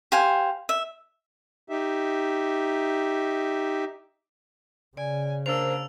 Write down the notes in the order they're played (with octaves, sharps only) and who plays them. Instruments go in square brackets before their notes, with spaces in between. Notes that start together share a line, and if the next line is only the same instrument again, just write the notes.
[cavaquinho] G4 C5 F5 G#5
E5
[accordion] D#4 G4 E5
[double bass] C#3 [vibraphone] D5 [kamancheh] G#5
[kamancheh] A#3 D4 [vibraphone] C5 [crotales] E6 F7